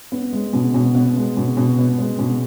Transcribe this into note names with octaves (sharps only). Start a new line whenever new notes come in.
B3
G#3
B2
B2
B3
G#3
B2
B2
B3
G#3
B2